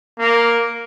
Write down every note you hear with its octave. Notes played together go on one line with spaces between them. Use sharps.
A#3